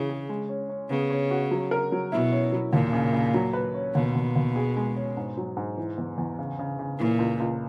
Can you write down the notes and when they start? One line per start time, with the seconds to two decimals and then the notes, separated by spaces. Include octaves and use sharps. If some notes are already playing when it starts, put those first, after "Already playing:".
Already playing: C#3 E3
0.09 G#4
0.29 G#3
0.49 C#4
0.69 C#4
0.90 C#3 B3
1.10 C#5
1.31 F#4
1.51 F#3
1.71 A#4
1.92 F#3
2.12 B2 E4
2.32 C#4
2.52 F#3
2.73 D#2 A#2
2.93 C#3
3.13 C#3
3.34 F#3
3.53 B4
3.74 C#4
3.95 D#2 B2
4.15 D#2
4.35 D#2
4.56 G#4
4.76 G#3
4.97 C#4
5.17 G#2
5.37 F#3
5.57 G#2
5.77 E3
5.98 E2
6.18 E2
6.39 C#3
6.59 C#3
6.79 C#3
6.99 A#2 E3
7.19 C#2
7.40 C#2